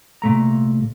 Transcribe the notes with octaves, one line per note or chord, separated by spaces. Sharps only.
C2 A#2 A3 A#5